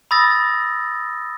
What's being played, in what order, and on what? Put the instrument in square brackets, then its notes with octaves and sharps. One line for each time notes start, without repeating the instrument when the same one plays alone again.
[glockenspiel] B5 D#6 E6 A6 A#6